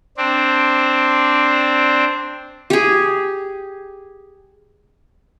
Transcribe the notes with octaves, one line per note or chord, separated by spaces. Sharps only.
C4 D4
G4 G#4